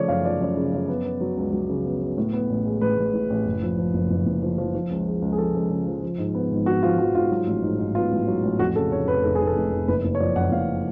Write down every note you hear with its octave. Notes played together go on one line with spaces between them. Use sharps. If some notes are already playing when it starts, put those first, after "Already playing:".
Already playing: C#3 F3 A3 C#5 D5
F#2 F5
F3 D5
F#2
C#3
F#2
B3
B3
F#3
C#2
F#3
C#3
B3
B3
A2
B3
A1
G#3
A1 B4
A1
A2
A1
F#1
F3
F3
F#1
F#1
F#1
F3
F3
F3
C#2
G#3
C#2
G#4
F3 A4
C#2
C#3
F3
F3
G#2
B3
G#1
B3 F#4
F3 F4
F3 F#4
G#2 F4
F#3
A1
G#2
G#2
B3 F4
A1
F#3
A1
F2 F#4
C#3 A4
F1 C#5
F1 B4
F1 A4
F1 G#4
A4
F1
F1
F#1 B4
F#1
C#5
F3 D5
F#1 F#5
F#1 F5